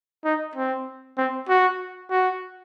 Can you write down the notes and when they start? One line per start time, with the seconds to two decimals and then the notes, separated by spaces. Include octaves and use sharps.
0.25 D#4
0.56 C4
1.18 C4
1.49 F#4
2.11 F#4